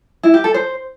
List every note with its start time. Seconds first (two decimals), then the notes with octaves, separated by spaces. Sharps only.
0.23 E4
0.34 G4
0.44 A4
0.54 C5